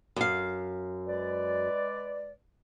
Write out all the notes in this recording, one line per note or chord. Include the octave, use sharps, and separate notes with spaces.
F#2 F5
G#3 B4 D5